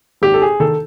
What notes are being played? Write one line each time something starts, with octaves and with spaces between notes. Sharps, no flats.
G#1 G4
A4
G#4
D#3 A4